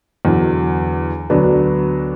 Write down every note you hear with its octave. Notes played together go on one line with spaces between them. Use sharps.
E2 D3 F#3
D2 D3 F#3 B3 D4